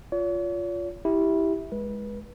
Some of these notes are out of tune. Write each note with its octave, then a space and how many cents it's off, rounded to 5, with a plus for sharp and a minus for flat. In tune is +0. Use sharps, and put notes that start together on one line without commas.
F4 +0 C#5 +45
E4 -15 G4 +0
G#3 +0 B4 -25